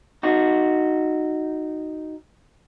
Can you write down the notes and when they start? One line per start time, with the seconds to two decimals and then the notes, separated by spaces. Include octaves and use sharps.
0.23 D#4 F#4